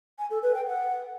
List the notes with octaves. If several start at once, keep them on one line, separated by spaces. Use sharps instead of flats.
G#5
A4
B4
G5
F#5